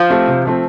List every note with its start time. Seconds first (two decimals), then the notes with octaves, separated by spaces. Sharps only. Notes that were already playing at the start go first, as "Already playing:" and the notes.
Already playing: F3
0.10 A3 C4 G4
0.28 C3
0.45 F3 A3 C4